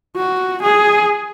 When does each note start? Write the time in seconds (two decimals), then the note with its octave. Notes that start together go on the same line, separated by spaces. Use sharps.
0.16 F#4
0.63 G#4